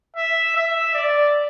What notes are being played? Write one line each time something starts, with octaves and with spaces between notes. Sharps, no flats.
E5
E5
D5